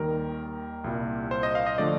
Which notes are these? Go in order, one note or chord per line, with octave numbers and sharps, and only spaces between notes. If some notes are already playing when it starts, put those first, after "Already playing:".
Already playing: D#2 D#3 G3 A#4
C2 A#2 G3
C5
D#5
F5
D#5
D3 F3 A3 D5